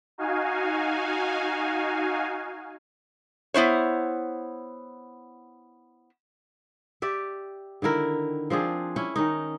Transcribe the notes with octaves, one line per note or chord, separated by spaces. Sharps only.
D#4 F#4 F5 G#5
B3 E4 C5 C#5
G4 D5 E5
D3 D#3 E4 A#4
F3 C4 D4 G#4
C#4 E4
D#3 C#4 D#4